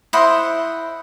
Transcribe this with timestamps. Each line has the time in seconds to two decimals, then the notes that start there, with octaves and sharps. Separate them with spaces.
0.13 E4 C5 D#5 F#5